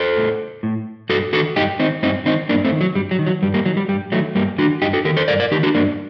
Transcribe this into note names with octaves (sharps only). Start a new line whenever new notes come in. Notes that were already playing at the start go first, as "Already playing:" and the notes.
Already playing: A4 C5
A2
A2
G2 F#4 A4
D#3 F#4 A4
G2 D#4 G4
D#3 C4 D#4
G2 C4 D#4
D#3 C4 D#4
G2 A#3 D4
A3 C4
D#3
F#3
G2 G3
F#3
D#3
F#3
G2 G3
G3 A#3
D#3 F#3
G3
G2 G3
D#3 F#3 A3
G2 G3 A#3
D#3 D4 F#4
G2 D#4 G4
F#4 A4
D#3 G4 A#4
A4 C5
G2 A#4 D5
A#4 D5
D#3 D#4 G4
D4 F#4
G2 A#3 D4